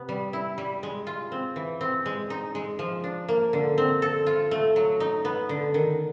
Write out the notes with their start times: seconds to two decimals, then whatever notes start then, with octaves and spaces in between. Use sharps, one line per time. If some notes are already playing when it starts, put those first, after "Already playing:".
Already playing: C3 B3
0.09 G3
0.33 E4
0.58 G3
0.83 G#3
1.07 F4
1.32 C4
1.56 E3
1.81 C4
2.06 G#3
2.30 D#4
2.55 G#3
2.79 F3
3.04 D4
3.28 A#3
3.53 D3
3.78 C4
4.02 A4
4.26 F4
4.51 A3
4.76 F#3
5.00 D#4
5.25 B3
5.49 D3
5.74 D#3